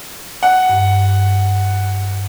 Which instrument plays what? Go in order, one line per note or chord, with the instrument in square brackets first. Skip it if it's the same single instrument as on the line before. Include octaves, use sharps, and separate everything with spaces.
[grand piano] F#5
[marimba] G2